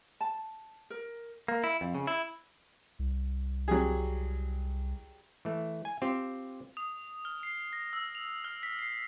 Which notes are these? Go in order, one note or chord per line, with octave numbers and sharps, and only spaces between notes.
A5
A#4
A#3
E4
F2
C#3
E4
C2
F#3 G3 G#4
E3 A3
G#5
C4 F4 G4
D#6
F6
C7
A#6
E6
F7
F6
B6
C7